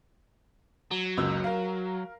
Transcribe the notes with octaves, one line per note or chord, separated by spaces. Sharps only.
F#3
F#1 C#2 E6
A#4 F5